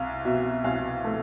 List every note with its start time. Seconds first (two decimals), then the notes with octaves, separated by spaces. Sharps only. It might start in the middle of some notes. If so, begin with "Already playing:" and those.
Already playing: C2 F5
0.25 B2 E5
0.64 C2 F5
1.04 A3